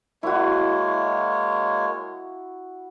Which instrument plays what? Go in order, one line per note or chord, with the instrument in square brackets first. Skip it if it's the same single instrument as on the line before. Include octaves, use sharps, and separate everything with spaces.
[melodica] G#3 A#3 C#5 [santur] E4 F#4